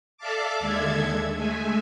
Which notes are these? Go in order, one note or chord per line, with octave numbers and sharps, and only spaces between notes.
A4 D5 E5 F5 A5 D6
D#2 D3 G#3 A4 E5 G#6
G#3 A3 E5 G#5